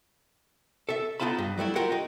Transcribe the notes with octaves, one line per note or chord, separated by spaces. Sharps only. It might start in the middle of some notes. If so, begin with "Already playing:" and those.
A4 E5
B3 D#4 F4 A5 B5
G2
F#3 G3 A3 E4
F4 G4 A#4 F#5
D#4